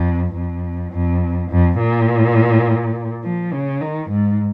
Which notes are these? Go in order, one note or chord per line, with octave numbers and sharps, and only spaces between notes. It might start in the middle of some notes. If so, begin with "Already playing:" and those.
Already playing: F2
F2
F2
F2
A#2
F3
C#3
D#3
G#2